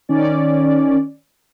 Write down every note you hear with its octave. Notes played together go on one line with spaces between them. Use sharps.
D#3 C#4 D5